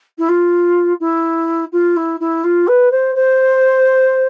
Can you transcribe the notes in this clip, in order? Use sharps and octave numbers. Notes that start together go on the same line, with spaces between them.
E4
F4
E4
F4
E4
E4
F4
B4
C5
C5